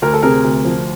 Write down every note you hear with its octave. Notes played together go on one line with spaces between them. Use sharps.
D2 A#4
A4
C3 G#4 A#4
D2
F3